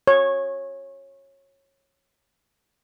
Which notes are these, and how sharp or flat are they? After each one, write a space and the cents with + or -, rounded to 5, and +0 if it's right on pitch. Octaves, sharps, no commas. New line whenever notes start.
C#5 -20